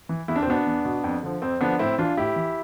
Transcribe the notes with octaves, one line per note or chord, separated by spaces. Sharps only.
E3
E2 E4
D4
C4
B2 B3 D4
E2
B2
F2
D3 F3
F2 C4
D3 F3 B3 D4
A2 C4 E4
E3 D4 F4
A2 E4 G4
E3